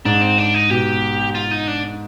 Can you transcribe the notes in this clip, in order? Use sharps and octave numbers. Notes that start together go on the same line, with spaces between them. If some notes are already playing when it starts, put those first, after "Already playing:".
G#2 D4
C4
D4
D#4
B2 G4
F4
D#4
D4